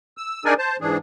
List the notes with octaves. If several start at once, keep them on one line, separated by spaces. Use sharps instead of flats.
E6
D4 D#4 G#4 A#4 D5 G#5
C5 A5
G#2 E3 D4 G#4